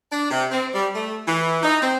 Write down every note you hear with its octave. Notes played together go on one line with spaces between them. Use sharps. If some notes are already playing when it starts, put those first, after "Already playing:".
D4
C3
C4
G3
A3
E3
D#4
C4